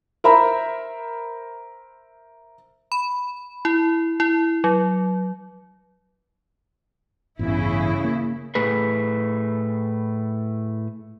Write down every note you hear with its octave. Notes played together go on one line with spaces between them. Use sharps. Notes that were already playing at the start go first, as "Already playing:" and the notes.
A#4 C5 E5 A#5 B5
B5
E4
E4
F#3
A1 E2 G2 C#3 E4
A#3
A2 A3 G#4 B4